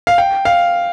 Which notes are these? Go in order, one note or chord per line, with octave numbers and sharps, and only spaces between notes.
F5
G5
F5